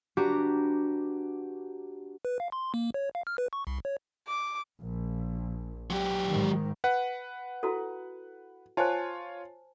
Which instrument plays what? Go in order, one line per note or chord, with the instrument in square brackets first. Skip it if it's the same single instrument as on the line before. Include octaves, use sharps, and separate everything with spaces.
[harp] D4 F#4 G4 B4 A#5
[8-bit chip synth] B4
F5
C6
A#3
C#5
F5
F6
B4
C#6
C2
C#5
[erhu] D6
[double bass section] A#1
[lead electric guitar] F#3 G4
[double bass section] G#2 D#3
[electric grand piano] B4 F#5
[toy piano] E4 F#4 A4
[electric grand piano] F4 C#5 [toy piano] C5 G#5 A5